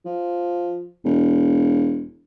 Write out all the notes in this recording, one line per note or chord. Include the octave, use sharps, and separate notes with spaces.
F3
E1